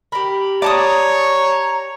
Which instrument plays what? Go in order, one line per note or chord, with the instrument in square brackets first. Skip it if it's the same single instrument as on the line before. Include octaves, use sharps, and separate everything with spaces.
[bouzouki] G4 A#4 [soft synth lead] B5
[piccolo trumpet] C#5 [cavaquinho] D5 A5 D#6 [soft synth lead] A#5